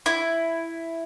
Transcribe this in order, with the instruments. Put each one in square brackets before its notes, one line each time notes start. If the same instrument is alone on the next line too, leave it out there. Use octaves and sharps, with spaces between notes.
[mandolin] E4